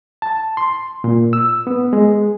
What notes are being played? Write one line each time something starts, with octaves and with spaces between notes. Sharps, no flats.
A5
C6
A#2
E6
B3
G#3